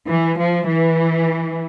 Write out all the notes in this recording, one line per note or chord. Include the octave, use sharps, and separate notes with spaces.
E3
F3
E3